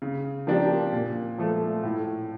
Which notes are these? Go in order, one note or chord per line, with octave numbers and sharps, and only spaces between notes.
C#3
F3 A#3 D4 G4
A#2
F3 A3
A2